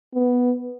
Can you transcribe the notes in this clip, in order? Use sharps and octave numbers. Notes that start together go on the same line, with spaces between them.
B3